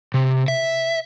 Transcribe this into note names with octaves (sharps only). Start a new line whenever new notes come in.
C3
E5